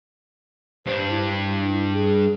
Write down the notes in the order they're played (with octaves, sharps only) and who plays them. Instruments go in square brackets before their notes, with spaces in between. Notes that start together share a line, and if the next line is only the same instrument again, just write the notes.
[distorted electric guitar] G2 D4 [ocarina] C5
[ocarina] E4
G#4